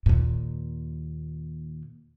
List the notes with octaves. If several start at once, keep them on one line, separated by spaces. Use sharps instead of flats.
D#2 A#2